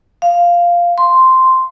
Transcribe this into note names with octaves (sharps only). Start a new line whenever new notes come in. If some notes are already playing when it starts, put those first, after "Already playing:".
F5
C6